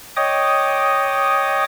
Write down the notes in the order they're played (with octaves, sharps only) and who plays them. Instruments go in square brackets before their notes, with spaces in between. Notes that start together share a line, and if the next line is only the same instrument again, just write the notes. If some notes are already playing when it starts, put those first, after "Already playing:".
[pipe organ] C#5 D#5 G5 D6 D#6